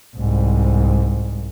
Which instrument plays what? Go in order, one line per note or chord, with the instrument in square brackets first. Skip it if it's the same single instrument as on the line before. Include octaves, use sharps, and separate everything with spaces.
[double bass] C2 G#2